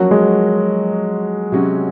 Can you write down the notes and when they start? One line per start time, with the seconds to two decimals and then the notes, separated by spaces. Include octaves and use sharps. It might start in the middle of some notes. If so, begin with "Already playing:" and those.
Already playing: F3 F#3 A#3 C#4 F#4
0.11 G#3
1.52 C3 F#3 C#4 F#4